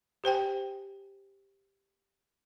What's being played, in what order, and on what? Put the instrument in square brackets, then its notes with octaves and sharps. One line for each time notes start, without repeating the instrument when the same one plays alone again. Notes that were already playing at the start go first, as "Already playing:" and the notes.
[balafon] G4 C5 G5 G#5